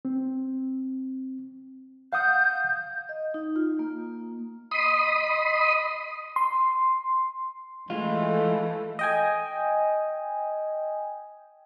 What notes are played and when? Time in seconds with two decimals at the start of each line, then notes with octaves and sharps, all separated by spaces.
0.05 C4
2.13 F5 F#5 D#6 G6
3.09 D#5
3.34 D#4
3.56 F4
3.79 A#3
4.71 D#5 B5 C6 D#6
6.36 C6
7.90 E3 G#3 A3 F4
8.99 D#5 G5 G#5